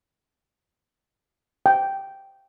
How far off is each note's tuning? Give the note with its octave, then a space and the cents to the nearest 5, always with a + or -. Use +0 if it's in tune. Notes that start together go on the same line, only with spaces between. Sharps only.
G5 -5